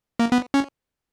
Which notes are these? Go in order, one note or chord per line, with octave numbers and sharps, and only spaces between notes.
A#3
B3
C#4